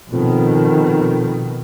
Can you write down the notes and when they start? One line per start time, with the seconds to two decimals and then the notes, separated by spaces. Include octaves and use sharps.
0.13 F2 B2 D#3